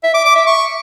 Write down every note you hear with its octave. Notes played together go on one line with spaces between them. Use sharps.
E5
D6
D6
E5
C#6